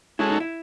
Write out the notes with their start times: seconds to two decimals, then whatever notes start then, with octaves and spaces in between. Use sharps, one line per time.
0.19 G#3 C#4 E4 F#4 A4
0.30 D#4
0.40 E4